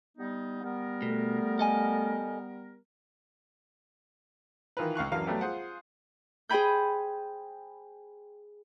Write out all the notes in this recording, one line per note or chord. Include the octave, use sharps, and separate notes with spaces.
G3 B3 D#4
G3 B3 A#4
B2 A3
A4 D#5 G#5
D#3 E3 F4 A#4 B4
C#2 F5 C#6 F#6
A1 F#2 E3 F#3 A#4 F5
F#3 G3 A3 B3 G4
F4 G#4 C5 F#5
G#4 C5 G5 G#5 B5 G6